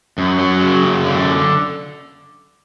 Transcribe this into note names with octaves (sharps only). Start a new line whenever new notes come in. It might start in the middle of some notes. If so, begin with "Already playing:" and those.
F#2
F#3
C#3
F#2
D3